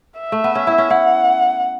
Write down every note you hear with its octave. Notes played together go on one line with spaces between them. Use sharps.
E5
A3
B3
C#4
E4
C#4
E4 F#5